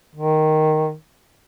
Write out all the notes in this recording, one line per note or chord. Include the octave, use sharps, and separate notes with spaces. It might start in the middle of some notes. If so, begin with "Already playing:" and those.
D#3